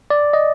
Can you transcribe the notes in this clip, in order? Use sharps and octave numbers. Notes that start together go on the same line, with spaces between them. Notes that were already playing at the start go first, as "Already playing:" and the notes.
D5
D#5